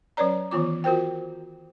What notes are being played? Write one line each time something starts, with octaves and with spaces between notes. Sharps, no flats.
F#3 C#4 B4 C#5 D5 A#5
D#3 E3 B3 F4 D6
F4 F#4 A#4 C5 G5